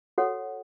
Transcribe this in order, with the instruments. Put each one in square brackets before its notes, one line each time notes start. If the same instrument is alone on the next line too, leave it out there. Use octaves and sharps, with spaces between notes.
[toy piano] F#4 A4 C#5 F#5